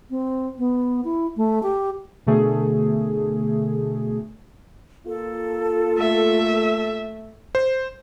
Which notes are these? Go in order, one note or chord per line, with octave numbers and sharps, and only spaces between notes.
C4
B3
E4
A3
G4
B2 D3 A3 G#4
A#3 F4 A4
A3 E5
C5